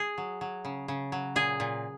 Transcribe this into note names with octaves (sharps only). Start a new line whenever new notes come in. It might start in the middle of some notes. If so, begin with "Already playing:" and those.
Already playing: G#4
F#3
F#3
C#3
C#3
F#3
A#2 G#4
A#2